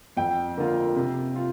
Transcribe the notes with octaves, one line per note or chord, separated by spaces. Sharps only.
F2 G5
D3 A#3 F4
C3
F4